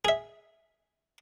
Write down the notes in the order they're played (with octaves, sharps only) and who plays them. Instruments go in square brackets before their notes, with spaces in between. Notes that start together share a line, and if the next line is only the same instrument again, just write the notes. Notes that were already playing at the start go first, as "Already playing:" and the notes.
[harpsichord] G#4 E5